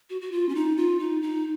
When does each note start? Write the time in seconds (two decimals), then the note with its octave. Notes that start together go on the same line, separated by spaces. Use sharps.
0.10 F#4
0.21 F#4
0.32 F4
0.49 C#4
0.55 D#4
0.77 F4
1.00 D#4
1.22 D#4